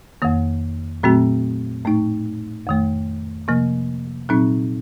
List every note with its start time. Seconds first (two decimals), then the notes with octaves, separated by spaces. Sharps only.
0.22 F2 D#3 A#3
1.03 A#2 F#3 A3 C4 F#4
1.85 A2 A3 D#4
2.67 F2 D#3 A3
3.48 C3 F3 A#3
4.29 A#2 F#3 C4 D#4